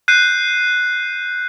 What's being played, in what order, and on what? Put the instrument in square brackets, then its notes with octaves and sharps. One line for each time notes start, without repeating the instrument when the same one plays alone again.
[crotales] F#6 G6 C7 D#7